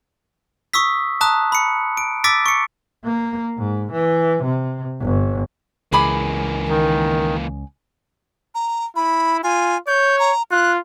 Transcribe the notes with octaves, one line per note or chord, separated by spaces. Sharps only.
C#6 D#6 E6 B6
A5 A#5 D#6 F#6
B5 C#7
D7
D6 E6 A6 B6 D7
C#6 C#7
A#3
G#2
E3
C3
G1
C#2 E3 A#3 G#4 B5 D6
D#3
A#5
E4 B5
F4 G#5
C#5 G6
A#5
F4 F#6